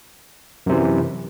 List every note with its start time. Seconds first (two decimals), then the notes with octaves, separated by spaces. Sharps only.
0.66 F#2
0.69 C3
0.72 E3